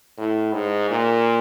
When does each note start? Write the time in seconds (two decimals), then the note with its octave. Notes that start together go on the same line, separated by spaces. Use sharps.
0.18 A2
0.53 G#2
0.90 A#2